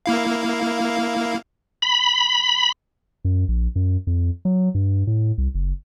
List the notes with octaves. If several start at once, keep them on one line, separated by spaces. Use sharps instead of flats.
A#3 E4 F5
B5
F#2
A#1
F#2
F2
F#3
G2
A2
C2
F#1